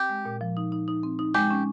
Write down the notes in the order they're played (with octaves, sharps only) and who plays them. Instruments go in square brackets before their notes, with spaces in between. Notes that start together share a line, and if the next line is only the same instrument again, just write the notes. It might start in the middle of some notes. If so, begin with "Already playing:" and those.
Already playing: [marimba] C4 [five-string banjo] G4
[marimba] G#3
A#2
F3
D#4
D#4
D#4
C4
D#4
[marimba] G#3 [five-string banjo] G4
[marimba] C#4